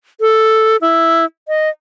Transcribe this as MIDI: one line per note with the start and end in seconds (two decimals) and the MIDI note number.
0.20 0.77 69
0.81 1.25 64
1.48 1.69 75